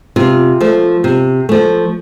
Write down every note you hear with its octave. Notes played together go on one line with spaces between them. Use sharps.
C3 F4
F3 A3
C3
F3 A3